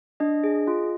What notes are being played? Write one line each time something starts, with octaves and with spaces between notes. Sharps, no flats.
D4 D#5
G#4
F4